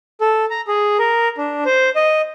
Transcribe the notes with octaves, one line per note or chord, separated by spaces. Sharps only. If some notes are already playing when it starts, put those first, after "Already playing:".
A4
A#5
G#4
A#4
D4
C5
D#5